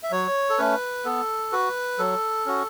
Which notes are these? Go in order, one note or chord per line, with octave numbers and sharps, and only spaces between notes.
E5
F#3 C#5
A4
A3 C#4 B4
B3 A4
F#4 B4
F#3 A4
C#4 F#4